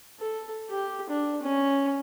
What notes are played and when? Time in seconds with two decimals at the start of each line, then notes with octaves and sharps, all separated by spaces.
0.20 A4
0.69 G4
1.10 D4
1.42 C#4